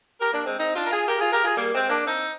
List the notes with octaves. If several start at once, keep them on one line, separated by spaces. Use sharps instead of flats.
G4 A#4
A#3 D4
G#3 C4
C4 D#4
D4 F4
A#4
F4 G#4
G4 A#4
F4 G#4
G4 A#4
F4 G#4
G3 A#3
G#3 C4
A#3 D4
C4 D#4